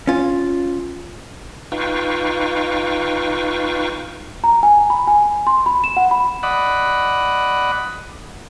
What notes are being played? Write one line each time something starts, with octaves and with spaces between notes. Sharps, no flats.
C#4 F4
D#4 F4 B4 F5 G5 C#6
A#5
G#5
B5
G#5
C6
B5
E7
F#5
B5
D5 D#5 F#5 B5